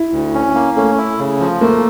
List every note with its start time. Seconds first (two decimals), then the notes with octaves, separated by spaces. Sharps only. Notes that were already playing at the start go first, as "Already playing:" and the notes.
Already playing: E4
0.12 D2
0.34 C#4
0.55 A#3
0.76 A3 C#4
0.98 E4
1.19 C#3
1.40 F3
1.61 A3 A#3